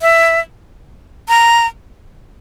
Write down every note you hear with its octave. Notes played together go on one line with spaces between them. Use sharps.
E5
A#5